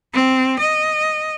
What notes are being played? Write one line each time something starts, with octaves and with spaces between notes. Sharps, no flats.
C4
D#5